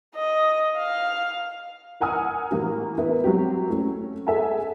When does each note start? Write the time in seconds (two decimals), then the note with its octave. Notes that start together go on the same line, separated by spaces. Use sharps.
0.15 D#5
0.78 F5
2.00 A#4 F#5 G#5 A#5 D#6 F6
2.51 A2 E3 A#3 G4
2.98 B3 A#4 E5
3.24 F#3 C4 F#4 G4
3.70 A3 C#4
4.27 G#4 A4 E5 F#5 G#5 A5